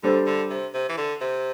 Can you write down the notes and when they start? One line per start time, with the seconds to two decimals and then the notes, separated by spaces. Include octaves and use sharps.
0.03 D3 G3 D4 A4 C5
0.26 D3
0.50 C3
0.74 C3
0.89 E3
0.98 D3
1.21 C3